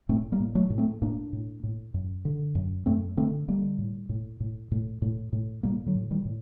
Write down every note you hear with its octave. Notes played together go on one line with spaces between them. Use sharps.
A2 A3 C4
G3 A#3
A2
F#3 A3
A2
A3 C4
A2 A#3 D4
A2
A2
F#2
D3
F#2
F#2 A3 C4
D3 A3 C4
D3 G3 A#3
A2
A2
A2
A2
A2
A2
A2 G3 A#3
D3 F#3
A2
D#3 G3
A2